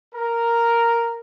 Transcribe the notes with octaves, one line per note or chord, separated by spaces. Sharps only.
A#4